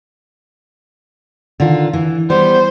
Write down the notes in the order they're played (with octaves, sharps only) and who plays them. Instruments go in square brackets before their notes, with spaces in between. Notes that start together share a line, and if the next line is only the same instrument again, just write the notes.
[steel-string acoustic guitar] D3 D#3 F4
E3
[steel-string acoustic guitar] G3 B3 [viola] C5